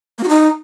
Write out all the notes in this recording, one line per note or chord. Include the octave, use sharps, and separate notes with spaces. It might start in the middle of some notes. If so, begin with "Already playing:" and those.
A#3
F#4
D#4